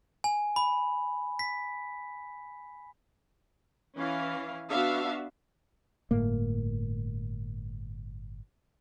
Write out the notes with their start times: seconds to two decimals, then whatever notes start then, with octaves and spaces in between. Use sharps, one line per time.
0.24 G#5
0.56 B5
1.39 B6
3.97 E3 C#4 F5
4.70 B3 D4 F#4 E5 F5
6.11 G1 A2 A#3